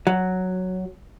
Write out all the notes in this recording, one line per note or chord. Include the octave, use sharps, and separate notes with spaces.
F#3